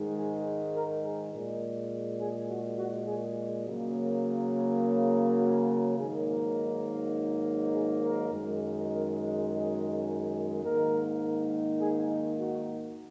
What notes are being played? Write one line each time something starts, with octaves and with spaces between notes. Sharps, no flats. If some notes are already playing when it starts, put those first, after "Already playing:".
Already playing: G#2 D#3 G#3
G#4
A#4
G#4
A#2 G#3
G#4
F#4
F#4
G#4
C#3 F#3 A#3
G#4
F#4
G#2 D#3 F#3 A#3 G#4
A#4
G#4
A#4
F#2 D#3 G#3
A#4
G#4
G#2 D#3 A#3 A#4
G#4
D#4
F#4